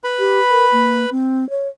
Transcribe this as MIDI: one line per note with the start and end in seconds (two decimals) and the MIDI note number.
0.04 1.10 71
0.04 1.10 83
0.19 0.40 67
0.50 0.66 70
0.72 1.06 58
1.11 1.48 60
1.50 1.68 73